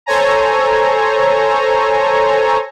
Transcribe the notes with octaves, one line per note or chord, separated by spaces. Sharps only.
A4 C5 C#5 G#5 A#5